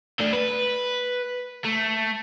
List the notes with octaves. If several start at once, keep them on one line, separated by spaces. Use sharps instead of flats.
A3 D4
B4
A3